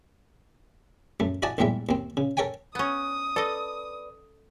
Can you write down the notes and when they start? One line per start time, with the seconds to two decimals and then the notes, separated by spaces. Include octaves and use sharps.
1.20 F#2 A3
1.42 E4 F#4 D5 D#5 G#5 A5
1.58 A#1 E2 A2 G3 G#3 E5
1.89 D#2 C4
2.17 C#3
2.37 A4 A#4 C#5 G5 G#5
2.75 B3 C#4 D#6
3.36 A4 B4 D5 D#5